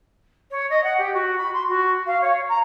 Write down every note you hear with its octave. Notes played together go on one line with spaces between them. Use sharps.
C#5
D#5
F#5
G4
F#4
B5
C6
F#4
F5
C#5
A#5